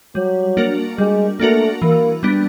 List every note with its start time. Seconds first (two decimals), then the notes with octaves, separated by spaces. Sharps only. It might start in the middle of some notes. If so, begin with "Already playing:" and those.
0.15 F#3 G3
0.57 A#3 D4 F#4 A#4
0.98 G3 G#3
1.39 A3 A#3 D4 F#4 A#4
1.82 E3 A#3
2.23 G3 B3 D4